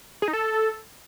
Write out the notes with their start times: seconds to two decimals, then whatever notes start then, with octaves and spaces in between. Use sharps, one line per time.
0.22 G#4
0.28 D#4
0.33 A4